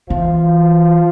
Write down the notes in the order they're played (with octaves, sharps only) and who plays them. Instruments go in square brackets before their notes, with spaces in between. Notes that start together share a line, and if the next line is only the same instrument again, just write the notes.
[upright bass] E3 [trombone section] F3 F4